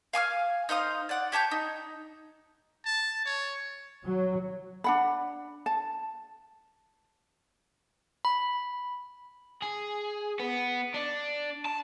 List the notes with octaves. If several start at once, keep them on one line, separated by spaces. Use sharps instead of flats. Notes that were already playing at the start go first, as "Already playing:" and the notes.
F5 G#5 D6 F6
D#4 C5 F5 D#6
D5 F#5
G4 C#5 A5 G6
D#4
A5
C#5
F#3
D4 F#5 B5
A5
B5
G#4
B3
D4
A5